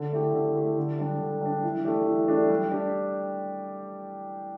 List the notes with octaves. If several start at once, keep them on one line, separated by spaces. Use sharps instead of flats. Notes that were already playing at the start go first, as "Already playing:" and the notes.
Already playing: D3
A3 E4 G4
D3
A3 E4 G4
D3
G3 D4
D3
G3 D4
E3
A3 D4 G4
E3
A3 D4 G4
G3
D4 G4